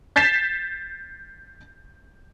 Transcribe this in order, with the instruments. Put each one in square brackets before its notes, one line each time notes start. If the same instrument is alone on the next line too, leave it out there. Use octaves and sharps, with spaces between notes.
[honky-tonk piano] G6 A6 B6 C7 E7